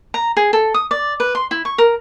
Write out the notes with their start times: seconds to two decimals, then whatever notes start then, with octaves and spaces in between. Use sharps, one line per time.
0.14 A#5
0.37 G#4
0.53 A4
0.74 D#6
0.91 D5
1.20 B4
1.35 C6
1.51 E4
1.65 C#6
1.78 A#4